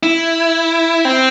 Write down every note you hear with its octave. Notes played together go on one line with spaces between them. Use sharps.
E4
C4